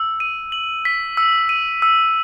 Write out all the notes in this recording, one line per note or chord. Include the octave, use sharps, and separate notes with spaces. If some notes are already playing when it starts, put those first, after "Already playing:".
Already playing: E6
D#7
F#7
B6
E6
D#7
E6